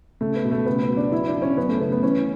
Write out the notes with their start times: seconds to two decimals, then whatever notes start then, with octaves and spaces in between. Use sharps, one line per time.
0.21 C#2 A3
0.36 B3
0.45 B2
0.51 A3
0.66 C#2 B3
0.83 B3
0.90 F#3
0.97 D4
1.12 F#3 E4
1.27 D4
1.35 F#3
1.42 C#4
1.57 F#2 B3
1.69 A3
1.80 C#3 B3
1.92 B3
2.03 E3 C#4